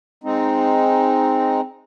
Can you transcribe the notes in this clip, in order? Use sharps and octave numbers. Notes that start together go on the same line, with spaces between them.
G#3 C4 D#4